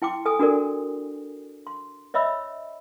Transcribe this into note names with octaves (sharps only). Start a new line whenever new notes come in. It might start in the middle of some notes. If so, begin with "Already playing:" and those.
E4 G5 C6 D6
A4 G#5 D#6
D4 F#4 A4 A#4 D5
C6
C#5 D#5 E5 B5 E6